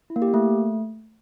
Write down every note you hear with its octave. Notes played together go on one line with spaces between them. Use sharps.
E4
A#3
G4
A#3
A3